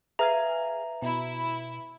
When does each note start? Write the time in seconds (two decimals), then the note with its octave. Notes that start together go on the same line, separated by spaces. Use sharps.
0.19 G#4 B4 E5 F5 G#5 A#5
1.02 B2 E4